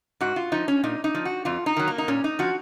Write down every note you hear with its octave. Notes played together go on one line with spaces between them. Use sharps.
G#2 F#4
F4
F3 D#4
C#4
A#2 D#4
D#4
F3
F#4
F2 F4
D#4
D#3 F#3
A#3
D#4
A#2 C#4
D#4
F3 F#4